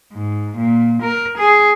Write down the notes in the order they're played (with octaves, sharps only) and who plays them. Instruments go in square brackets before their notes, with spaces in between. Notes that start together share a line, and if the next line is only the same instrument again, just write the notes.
[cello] G#2
A#2
A#4
G#4